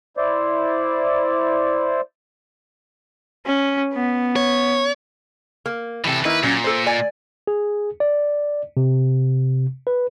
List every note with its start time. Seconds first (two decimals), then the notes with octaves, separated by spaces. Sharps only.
0.17 E4 C5 D5
3.46 C#4
3.94 B3
4.36 C#5
5.66 A#3
6.05 A2 C3 E3 A4 G5
6.25 D#3 A#3 E4 B4
6.43 A#2 F#3 C#4
6.64 A4 C5
6.87 D5 G#5
7.47 G#4
8.00 D5
8.77 C3
9.87 B4